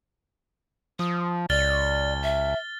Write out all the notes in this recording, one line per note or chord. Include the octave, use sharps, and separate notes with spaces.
F3 D#6
C#2 D5 F6 A6 G7
E5